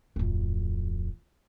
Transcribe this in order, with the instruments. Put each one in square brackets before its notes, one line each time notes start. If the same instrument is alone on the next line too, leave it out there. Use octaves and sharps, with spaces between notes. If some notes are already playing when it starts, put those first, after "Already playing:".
[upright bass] D1 F2